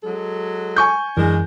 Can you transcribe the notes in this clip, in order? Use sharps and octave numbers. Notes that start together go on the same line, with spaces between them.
F#3 G#3 A4
G#5 C#6 G6
F#2 E3 G#3 D4 A#4